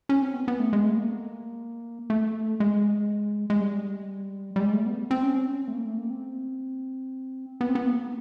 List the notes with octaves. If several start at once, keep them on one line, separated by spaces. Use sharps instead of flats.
C#4
C4
B3
B3
A3
G#3
A3
A#3
A3
G#3
G#3
G3
G3
G#3
A3
B3
C4
C#4
C4
C#4
C4
A3
A#3
A3
A#3
C4
B3
C4
B3
A#3